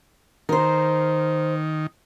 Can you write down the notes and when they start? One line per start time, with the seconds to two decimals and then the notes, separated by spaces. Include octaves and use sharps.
0.49 D#3 A#4 C5